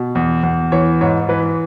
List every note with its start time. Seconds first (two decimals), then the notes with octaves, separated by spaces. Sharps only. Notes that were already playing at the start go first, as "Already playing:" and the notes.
Already playing: B2
0.15 E2
0.43 E2
0.72 E3 C#5
1.01 G#2 C#5
1.29 E3 B4